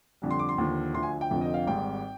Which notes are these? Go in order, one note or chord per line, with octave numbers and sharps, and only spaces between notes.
F2 D3 G3
C6
D6
C6
D#2 D3 F3
D2 D3 F3 C6
G#5
G5
F1 F2 D3 F3
D#5
F5
G#1 G#2 G3 G5